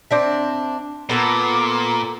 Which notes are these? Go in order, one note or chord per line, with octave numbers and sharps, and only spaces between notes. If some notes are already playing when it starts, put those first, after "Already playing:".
C4 D4 E5
A#2 B3 A4 A#4